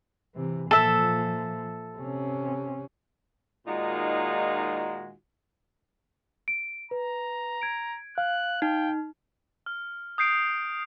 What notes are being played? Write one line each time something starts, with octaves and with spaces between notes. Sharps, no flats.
C3 E3
A#2 F3 A4 E5
C3 C#4
A#2 D#3 G#3 D#4 F4 F#4
D7
B4 A#5
G#6 D7
F5 F#6
D#4 G5
F6
D#6 G6 C7 D7